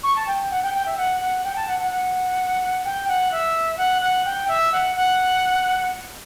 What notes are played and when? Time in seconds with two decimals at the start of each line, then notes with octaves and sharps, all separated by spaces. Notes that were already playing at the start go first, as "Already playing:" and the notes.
0.03 C#6
0.15 A5
0.27 G5
0.50 F#5
0.62 G5
0.73 G5
0.85 E5
0.97 F#5
1.20 F#5
1.44 G5
1.55 A5
1.67 F#5
1.79 F#5
1.90 F#5
2.84 G5
3.07 F#5
3.31 E5
3.77 F#5
4.01 F#5
4.24 G5
4.47 E5
4.72 F#5
4.95 F#5